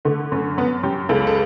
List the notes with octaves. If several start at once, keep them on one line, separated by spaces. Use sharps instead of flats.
D3 A3
F#2 A3
F#2 B3
F#2 G4
C#2 A4
A4